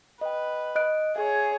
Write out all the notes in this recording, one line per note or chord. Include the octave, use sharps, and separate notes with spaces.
B4 D#5 G5
D#5 F#6 D7
G#4 C#5 E5